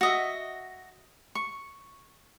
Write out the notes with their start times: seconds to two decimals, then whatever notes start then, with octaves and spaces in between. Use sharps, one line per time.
0.01 F#4 D#5 E5
1.35 C#6